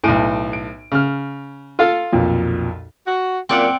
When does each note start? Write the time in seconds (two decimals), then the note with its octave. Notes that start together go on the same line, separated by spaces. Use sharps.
0.04 B1 A2 G#5 D7 D#7
0.53 D7
0.92 C#3 F6
1.79 F4 A4 F5
2.12 B1 F2 A#2
3.06 F#4
3.49 F#2 A#2 C4 D5 F#5